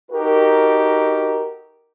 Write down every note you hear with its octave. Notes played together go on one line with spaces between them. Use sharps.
D#4 F#4 G4 A4 A#4